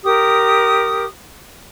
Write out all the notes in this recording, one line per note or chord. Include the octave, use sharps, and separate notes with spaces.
G4 A#4 D#6